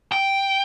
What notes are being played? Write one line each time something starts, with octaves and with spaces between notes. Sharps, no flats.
G5